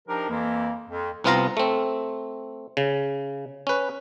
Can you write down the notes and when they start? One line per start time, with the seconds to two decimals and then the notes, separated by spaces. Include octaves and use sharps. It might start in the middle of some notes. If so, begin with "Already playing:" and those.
0.08 F3 D4 D#4 G4 A#4
0.29 F2 E3 A#3
0.88 F2
1.24 C2 B3 C4 F4 F5 A#5
1.57 A3 C4
2.77 C#3
3.67 C#4 B4